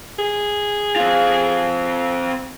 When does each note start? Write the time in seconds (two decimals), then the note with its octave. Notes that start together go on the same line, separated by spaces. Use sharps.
0.18 G#4
0.96 C4 F4